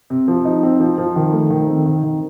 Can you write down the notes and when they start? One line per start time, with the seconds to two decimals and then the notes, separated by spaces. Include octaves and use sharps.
0.10 C3
0.28 F3
0.45 D#4
0.63 C4
0.80 F3
0.98 F3
1.16 D#3
1.33 A3
1.50 D#3
1.68 C4
1.86 D#3
2.03 D#3